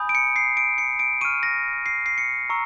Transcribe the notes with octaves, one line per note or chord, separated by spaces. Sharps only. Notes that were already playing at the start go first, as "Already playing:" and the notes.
Already playing: G#5 B5 D#6 G6
D7
C#7
C7
D7
C#7
D7
C#6 F6 D#7
A#6
C7
C7
C#7
A#5 C#6 E6